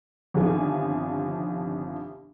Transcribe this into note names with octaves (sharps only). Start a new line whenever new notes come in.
G1 C2 D#3 F3 G#5